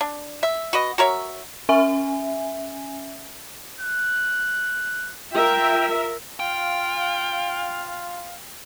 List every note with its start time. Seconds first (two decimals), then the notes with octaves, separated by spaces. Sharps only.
0.01 D4
0.43 E5
0.73 F#4 B4 D#5
0.98 F#4 A#4 C#5 E5
1.69 C#4 E5 G#5
3.80 F#6
5.34 F4 A#4 E5 G5
6.40 F4 F5 G5